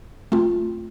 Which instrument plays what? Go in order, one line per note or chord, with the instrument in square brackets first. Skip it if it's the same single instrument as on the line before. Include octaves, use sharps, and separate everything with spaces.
[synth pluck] A3 C4 F4